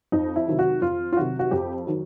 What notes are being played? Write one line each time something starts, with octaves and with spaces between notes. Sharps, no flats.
F2 D#4
E4
C3 D#3 F#3
F#4
F2 F4
F4
C3 D#3 F#3 F#4
F#4
F2 G4
D#3 F#3